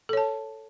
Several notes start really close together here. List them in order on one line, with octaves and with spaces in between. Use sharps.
A4 C#5 A5